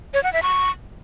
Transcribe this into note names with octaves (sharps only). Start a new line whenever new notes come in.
C#5
F#5
E5
C#6